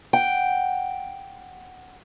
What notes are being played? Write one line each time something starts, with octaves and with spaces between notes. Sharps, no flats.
F#5 G5